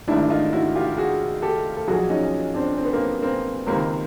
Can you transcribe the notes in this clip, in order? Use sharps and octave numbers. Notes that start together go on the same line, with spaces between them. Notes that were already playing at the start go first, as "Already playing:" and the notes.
A1 G#2 D#3 D4 E4
D#4 F4
E4 F#4
F4 G4
F#4 G#4
G4 A4
A4
B1 A#2 F3 F#4 G#4
C#4 D#4
C4 D4
C4
B3
A#3 C4
A#3 C4
C#2 C3 D#3 A#3 C4